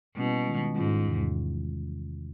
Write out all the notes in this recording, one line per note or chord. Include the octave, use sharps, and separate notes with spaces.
B2 G3 A#3 C#4 E4
D#3 G#3 C#4 F4
G#2 D#3 G#3 C#4 F4
E2 C3 E3